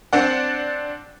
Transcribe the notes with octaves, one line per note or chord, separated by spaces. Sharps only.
C4 D4 D5 F#5